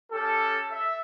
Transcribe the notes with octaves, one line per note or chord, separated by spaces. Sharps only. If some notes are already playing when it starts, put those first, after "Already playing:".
C#4 G4 A4
E5